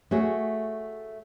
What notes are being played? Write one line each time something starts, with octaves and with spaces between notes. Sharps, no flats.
A3 F#4 G#4 C#5